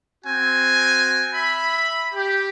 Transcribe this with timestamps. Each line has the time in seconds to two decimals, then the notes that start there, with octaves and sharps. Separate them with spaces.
0.25 C4 F#4 G#5
1.34 E5 B5
2.14 G4